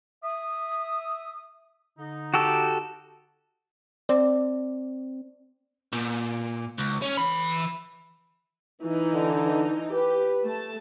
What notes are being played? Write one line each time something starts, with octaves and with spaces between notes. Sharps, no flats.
E5 D#6
D3 D#4
F#4 G4 A4
C4 D5
A#2
C#2
C#4
E3 B5
E3 D#4
D3
G4 B4
A3 A5